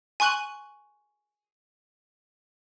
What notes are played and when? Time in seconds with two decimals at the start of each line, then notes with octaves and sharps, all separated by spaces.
0.20 G#5 C6 C#6 F#6 D#7 F#7